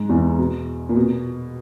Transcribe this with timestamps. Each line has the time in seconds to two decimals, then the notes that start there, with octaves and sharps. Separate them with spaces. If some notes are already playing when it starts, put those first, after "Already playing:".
Already playing: G#2
0.09 E2
0.38 B2
0.89 A#2
0.96 B2